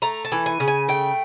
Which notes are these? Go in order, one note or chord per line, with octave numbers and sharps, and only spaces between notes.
A3 A#5
A5
E3
G#5
C#3
G#5
A3 G5